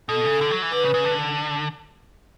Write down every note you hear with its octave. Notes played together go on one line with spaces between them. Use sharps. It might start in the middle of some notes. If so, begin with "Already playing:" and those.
B2 A4
C#3
D3
F#3
E3
D3 B4
C#3
C#3
D3